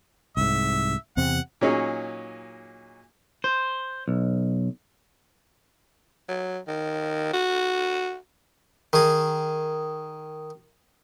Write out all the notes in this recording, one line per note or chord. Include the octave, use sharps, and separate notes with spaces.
C2 G#2 E5
E2 C3 C4 F#5
A#2 F#3 C#4 D#4 G#4
C5
B1
F#3
D#3
F#4
D#3 G#4